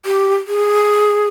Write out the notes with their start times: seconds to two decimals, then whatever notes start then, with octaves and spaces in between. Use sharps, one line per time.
0.06 G4
0.47 G#4